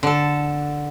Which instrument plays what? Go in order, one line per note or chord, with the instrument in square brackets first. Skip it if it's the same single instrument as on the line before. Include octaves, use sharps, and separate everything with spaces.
[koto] D3 A4